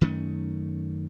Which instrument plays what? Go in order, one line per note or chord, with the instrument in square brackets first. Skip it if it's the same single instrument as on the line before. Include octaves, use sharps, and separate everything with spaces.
[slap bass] F#2 D#3 A3 C#4